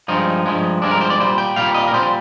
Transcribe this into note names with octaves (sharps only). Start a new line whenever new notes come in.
G2 F3 G#3 D#4
G2 F3 G#3
G2 F3 G#3 D4
A#4
C5
D5
A#2 G3 C5
G5
A#2 G3 F5
D#5
A#4
A#2 G3 C5